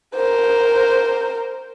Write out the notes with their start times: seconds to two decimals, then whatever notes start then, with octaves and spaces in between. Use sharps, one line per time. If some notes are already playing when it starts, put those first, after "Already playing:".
0.15 A#4 C5